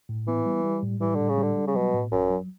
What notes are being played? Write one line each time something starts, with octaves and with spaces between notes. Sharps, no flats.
A2
E3 B3
G3
G3
A2
E3 G3
A2 D3
C#3
D3 G3
G3
C#3
B2 F#3
A2
A1 F#2
F#3